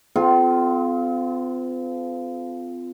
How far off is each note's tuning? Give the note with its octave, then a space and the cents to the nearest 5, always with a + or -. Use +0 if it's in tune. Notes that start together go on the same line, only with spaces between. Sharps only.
C4 -40 F4 -5 A4 -45